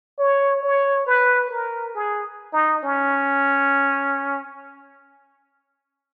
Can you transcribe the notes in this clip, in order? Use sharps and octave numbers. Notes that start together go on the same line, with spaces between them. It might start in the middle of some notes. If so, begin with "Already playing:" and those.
C#5
C#5
B4
A#4
G#4
D#4
C#4